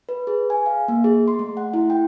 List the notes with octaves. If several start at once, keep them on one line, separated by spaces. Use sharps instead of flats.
B4
G#4
G#5
F5
A#3
G#4
C6
A3
F#5
E4
G5